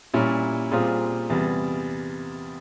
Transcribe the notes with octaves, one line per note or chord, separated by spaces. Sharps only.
A#2 G3 C#4 E4
A#2 G3 C4 F4 G#4
E2 C3 G3